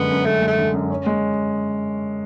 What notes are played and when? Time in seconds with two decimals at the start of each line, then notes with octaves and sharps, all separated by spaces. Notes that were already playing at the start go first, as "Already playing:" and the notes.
Already playing: F#2 D3 G#3 B3
0.10 F#2
0.25 F#2 A3
0.41 G#3
0.47 A3
0.58 D3
0.74 F#2
0.90 C#4
1.06 G#3